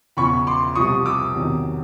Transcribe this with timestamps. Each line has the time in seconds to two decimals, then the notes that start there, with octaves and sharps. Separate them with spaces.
0.17 E2 C#3 F3 B5 C#6
0.47 C6 D6
0.75 C2 C3 F3 C#6 D#6
1.06 D6 E6
1.35 E2 C3 D#3 F#3